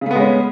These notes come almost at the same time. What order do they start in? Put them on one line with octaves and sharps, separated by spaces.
C#3 A3 B3 G#3 C#4